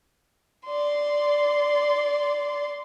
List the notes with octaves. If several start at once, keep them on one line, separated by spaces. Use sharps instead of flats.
D5 C6